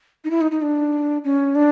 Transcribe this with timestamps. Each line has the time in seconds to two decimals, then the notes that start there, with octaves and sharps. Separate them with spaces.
0.24 D#4
0.31 E4
0.41 D#4
0.51 D#4
0.62 D4
1.24 C#4
1.55 D4